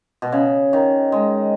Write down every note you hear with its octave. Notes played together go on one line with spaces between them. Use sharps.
B2
C#3
D#3
G#3